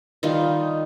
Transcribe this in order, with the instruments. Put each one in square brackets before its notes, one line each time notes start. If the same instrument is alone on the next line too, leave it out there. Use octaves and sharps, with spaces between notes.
[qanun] D#3 G3 D#4 F4